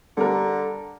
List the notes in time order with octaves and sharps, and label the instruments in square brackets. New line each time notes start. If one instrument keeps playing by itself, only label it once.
[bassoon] D3 [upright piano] G3 D4 A#4